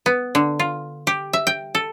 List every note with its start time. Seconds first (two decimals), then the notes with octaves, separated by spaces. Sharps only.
0.06 B3
0.35 D3
0.59 F4
1.07 G4
1.33 E5
1.47 G5
1.75 A4